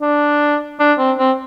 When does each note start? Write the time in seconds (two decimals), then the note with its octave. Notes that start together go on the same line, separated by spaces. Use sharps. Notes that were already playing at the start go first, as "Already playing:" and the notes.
0.02 D4
0.80 D4
0.98 C4
1.18 C4